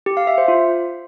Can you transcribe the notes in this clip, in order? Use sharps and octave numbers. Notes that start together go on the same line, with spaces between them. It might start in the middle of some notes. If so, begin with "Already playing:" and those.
G4
F5
E5
C5
F4